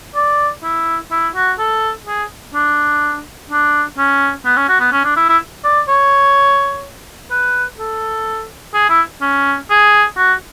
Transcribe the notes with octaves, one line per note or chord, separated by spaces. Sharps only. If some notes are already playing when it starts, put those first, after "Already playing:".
D5
E4
E4
F#4
A4
G#4
D4
D4
C#4
B3
C#4
F#4
B3
C#4
D4
E4
E4
D5
C#5
B4
A4
G#4
E4
C#4
G#4
F#4